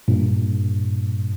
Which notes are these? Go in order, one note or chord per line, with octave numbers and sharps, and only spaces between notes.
G2 A#2